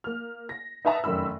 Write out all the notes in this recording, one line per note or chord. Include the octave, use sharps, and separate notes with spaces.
A#3 F6
A#6
D#4 B4 E5 A5 A#5 D#6
F1 F#2 D#3 B5 E6